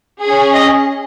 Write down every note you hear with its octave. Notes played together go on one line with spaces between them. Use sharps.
C#4 G#4
D#5